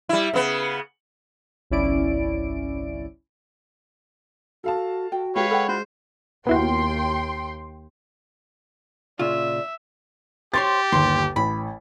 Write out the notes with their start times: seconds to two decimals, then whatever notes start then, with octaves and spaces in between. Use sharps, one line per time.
0.09 G3 E4
0.34 C#3 B3
1.70 G1 C2 C#4 E4 D5 D7
4.64 F#4 A4 F5 A5
5.12 F#4 G5
5.36 G#3 D#4 G4 B4 C#5 F5
5.50 A4 F#5 G5 B5
5.68 D4 F4 F#4 C5
6.47 D#2 B3 E4 F#4 G5 C6
9.19 A#2 C#3 F4 D5 E5
10.54 G4 C5 C#5 C6 A6
10.92 G1 D#2 C6
11.36 A1 B5